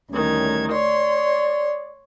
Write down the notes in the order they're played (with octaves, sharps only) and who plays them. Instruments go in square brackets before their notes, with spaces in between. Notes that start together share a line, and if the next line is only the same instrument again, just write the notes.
[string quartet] D2 D#3 G#6 [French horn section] A2 G3 C#4
[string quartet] C#5 C6 [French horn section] D5